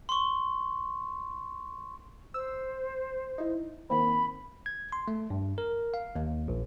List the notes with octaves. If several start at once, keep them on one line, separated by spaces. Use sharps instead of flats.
C6 C#6
C5 E6
D#4 E4
D#3 A#3 C4 B5
G#6
C6
A3
G2
A#4
F5
D#2
A#1